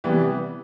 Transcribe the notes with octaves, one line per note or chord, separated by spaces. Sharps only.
C3 E3 G3 B3